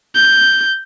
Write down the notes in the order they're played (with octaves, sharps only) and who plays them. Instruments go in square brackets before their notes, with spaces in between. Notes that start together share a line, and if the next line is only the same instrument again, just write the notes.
[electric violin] G6